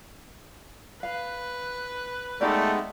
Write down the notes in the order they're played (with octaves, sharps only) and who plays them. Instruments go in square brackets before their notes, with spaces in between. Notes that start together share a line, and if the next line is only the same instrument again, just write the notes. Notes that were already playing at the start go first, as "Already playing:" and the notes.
[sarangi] B4 [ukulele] F5
[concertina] G#3 B3 [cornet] A3 [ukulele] D#4 G4 D5